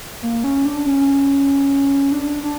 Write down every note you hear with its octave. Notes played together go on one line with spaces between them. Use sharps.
A#3
C#4
D4
C#4
D4
D4